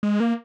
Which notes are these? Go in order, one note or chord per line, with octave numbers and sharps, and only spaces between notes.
G#3
A#3